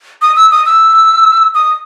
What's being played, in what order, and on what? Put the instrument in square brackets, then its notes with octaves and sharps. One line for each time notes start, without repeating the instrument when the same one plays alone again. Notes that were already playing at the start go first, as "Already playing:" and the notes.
[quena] D#6
E6
D#6
E6
D#6